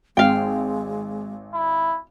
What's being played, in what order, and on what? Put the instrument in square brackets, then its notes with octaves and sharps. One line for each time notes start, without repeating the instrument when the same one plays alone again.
[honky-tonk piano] G#1 [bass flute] G#3 [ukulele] F5 G5
[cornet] E4